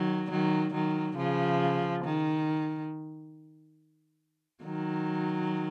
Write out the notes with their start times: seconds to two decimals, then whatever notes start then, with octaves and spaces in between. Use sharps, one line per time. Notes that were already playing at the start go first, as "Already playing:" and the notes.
Already playing: D#3 F#3
0.31 D#3 F#3
0.73 D#3 F#3
1.17 C#3 F3
2.04 D#3
4.63 D#3 F#3